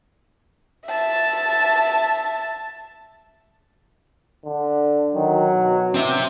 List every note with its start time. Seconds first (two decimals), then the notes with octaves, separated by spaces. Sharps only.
0.87 E5 A5
4.45 D3
5.15 D#3 F#3
5.52 B2
5.94 C4 E5